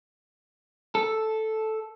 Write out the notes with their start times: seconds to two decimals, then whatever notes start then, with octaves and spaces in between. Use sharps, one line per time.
0.95 A4